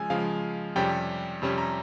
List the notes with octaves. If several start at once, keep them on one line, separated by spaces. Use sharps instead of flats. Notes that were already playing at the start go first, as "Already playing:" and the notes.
Already playing: C#3 F3 G#3 G#5 E6
C#3 F3 G#3 F5
F2 C3 G3 C#4 G5
F2 C3 G3 C#4
A#5